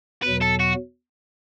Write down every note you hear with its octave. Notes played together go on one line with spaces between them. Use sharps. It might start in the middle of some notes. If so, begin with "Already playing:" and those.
E2 B2 F#3 B4
A4
F#4